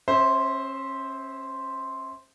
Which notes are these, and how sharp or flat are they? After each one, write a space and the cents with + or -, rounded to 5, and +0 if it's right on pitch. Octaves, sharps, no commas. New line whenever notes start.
C#4 -35 C5 +0 E5 -20